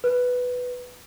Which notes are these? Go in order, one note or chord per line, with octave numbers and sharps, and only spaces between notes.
B4